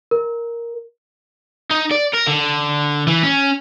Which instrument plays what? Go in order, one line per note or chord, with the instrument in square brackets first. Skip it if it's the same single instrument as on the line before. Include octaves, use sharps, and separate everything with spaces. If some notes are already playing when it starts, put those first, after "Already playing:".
[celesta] A#4
[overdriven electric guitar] D#4
D5
A#4
D3
E3
C#4